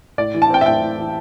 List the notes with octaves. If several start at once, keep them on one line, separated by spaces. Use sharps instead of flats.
A2 D5
E3
A5
C4 G5
E5
A2 G5
A2
E3